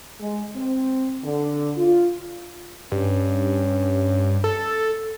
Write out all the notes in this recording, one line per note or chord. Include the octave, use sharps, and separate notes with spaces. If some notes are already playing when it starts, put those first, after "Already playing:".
G#3
C4
D3
F4
G2 C#4
A4